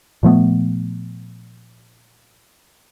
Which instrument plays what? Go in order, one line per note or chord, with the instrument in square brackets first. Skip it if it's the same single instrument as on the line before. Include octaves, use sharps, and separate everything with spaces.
[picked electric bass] A#2 F3 A3 B3